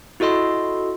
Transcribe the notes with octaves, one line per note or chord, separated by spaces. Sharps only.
E4 F#4 A4 D#5 C6